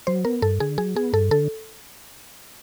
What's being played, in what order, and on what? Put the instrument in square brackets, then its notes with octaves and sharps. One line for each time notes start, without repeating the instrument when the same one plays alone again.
[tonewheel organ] F#3 [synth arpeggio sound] C5
[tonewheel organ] B3 [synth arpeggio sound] A#4
[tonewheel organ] G2 [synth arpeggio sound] A4
[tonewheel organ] D3 [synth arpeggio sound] G#4
[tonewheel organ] F#3 [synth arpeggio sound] G#4
[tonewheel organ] B3 [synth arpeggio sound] G#4
[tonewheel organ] G2 [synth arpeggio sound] A4
[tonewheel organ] D3 [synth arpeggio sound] A4